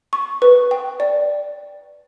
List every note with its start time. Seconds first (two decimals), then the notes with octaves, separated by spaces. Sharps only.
0.13 C#6
0.42 B4
0.71 G5
1.00 D5